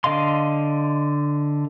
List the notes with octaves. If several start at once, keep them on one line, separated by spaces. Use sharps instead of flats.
D3 D#5 F5 C6